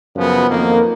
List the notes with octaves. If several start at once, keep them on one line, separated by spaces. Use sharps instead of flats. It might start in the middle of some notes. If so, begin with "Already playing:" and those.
F#2 C#3 F3 B3
F2 D#3 A#3